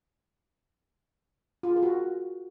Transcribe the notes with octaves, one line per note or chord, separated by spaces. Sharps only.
F4
G#4
A#4
F#4